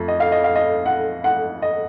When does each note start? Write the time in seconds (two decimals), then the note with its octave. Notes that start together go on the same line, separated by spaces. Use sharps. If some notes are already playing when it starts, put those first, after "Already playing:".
Already playing: F2 A3
0.08 D#5
0.20 F5
0.32 D#5
0.44 F5
0.55 D#5
0.86 F#5
1.24 F#5
1.62 D#5